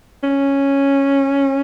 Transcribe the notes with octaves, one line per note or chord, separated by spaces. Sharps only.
C#4